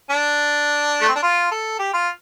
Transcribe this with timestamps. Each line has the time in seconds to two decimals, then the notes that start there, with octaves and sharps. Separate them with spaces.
0.10 D4
1.02 A3
1.08 C4
1.15 D4
1.23 F4
1.51 A4
1.79 G4
1.94 F4